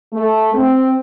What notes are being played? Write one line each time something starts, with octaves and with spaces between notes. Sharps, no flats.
A3
C4